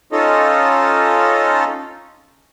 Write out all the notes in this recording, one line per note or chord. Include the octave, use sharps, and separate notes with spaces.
C#4 D#4 F4 A4 D#5